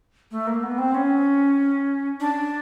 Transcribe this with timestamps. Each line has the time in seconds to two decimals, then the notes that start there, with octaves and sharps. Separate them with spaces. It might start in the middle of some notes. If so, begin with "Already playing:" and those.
0.31 A3
0.47 A#3
0.63 B3
0.78 C4
0.94 C#4
2.20 D4